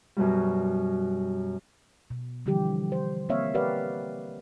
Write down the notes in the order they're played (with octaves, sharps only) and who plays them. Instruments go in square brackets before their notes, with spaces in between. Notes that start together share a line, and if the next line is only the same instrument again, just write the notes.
[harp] F#2 B2 F#3 G3
[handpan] B2
D3 E3 F3 G3 G4
C5
A#3 C4 C#5 E5 F5
G4 A#4 B4 D5 F5 F#5